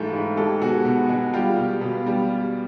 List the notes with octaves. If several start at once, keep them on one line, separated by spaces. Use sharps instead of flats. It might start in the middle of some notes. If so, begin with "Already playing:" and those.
Already playing: G#2 E3 A3 F4 G4
G#2
G#3 G4 A4
B2 F#4 G#4
B2
G#3
G3 F4 G4
B2
B2
G3